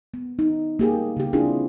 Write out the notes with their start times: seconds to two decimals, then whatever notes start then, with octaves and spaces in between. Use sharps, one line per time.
0.14 B3
0.39 D#4
0.79 A#3 G4 G#4
1.17 C#3 G4
1.33 C4 D4 E4 F4 G#4